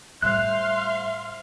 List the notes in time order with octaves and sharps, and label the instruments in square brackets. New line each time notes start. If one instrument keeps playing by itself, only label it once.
[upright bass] A2 G3 [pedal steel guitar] C5 F#6 [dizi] E5 [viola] F5 C6